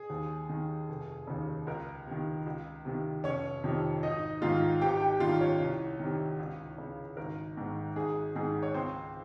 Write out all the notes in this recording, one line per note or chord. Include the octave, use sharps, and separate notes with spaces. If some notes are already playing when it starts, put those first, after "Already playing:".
Already playing: G#4
D#2
D#3
F1
D#2 C#3
C#2 A#4
C3 D#3
C#2
C3 D#3
F1 C#4 C#5
F2 C3 D#3
G#1 D#4 D#5
G#2 D#3 F4 F5
G#1 G4 G5
G4 G5
G2 D#3 F4 F5
C#4 C#5
C2
C3 D#3
C#2
C#3
G#1 A#4
G#2 D#3
G#1 G#4
G#2 D#3 G#4
C#5
C#2 C4 C5